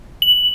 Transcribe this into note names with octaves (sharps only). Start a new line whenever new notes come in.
F#7